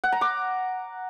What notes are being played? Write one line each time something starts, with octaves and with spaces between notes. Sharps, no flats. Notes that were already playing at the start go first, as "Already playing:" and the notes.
F#5
A#5
D6